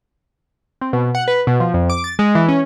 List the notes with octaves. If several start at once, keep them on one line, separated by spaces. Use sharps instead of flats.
C4
B2
F#5
B4
B2
F3
F2
D6
A6
G#3
E3
C#4